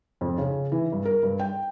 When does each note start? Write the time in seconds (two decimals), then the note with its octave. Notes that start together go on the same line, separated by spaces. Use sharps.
0.21 F2
0.38 C#3
0.72 E3
0.92 G2
1.05 A#4
1.23 G2
1.39 G5